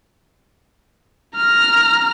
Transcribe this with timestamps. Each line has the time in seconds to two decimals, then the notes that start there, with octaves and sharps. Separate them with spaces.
1.36 A#5 F6